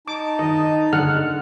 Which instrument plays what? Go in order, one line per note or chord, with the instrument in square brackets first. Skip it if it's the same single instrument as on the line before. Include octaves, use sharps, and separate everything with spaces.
[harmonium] D#4 A5 [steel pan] D6
[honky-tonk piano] D#3 [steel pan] D#5
[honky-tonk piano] D3 [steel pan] F#5 [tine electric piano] F6